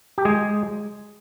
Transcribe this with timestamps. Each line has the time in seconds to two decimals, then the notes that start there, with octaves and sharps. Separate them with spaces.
0.18 G4
0.25 G#3 G#4